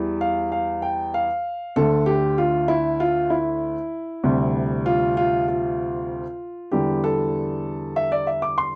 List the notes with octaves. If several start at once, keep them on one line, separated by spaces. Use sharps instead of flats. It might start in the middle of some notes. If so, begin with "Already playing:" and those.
Already playing: E2 E3 G3
F5
F5
G5
F5
D2 D3 A3 A4
G4
F4
E4
F4
E4
D2 C3 G3
F4
F4
F4
E2 D3 G3 G4
A4
E5
D5
E5
D6
C6